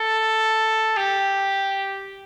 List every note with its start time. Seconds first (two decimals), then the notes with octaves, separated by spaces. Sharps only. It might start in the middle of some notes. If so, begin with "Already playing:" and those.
Already playing: A4
0.97 G4